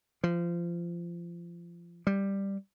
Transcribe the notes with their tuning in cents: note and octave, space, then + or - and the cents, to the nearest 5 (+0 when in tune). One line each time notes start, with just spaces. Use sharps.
F3 -25
G3 +5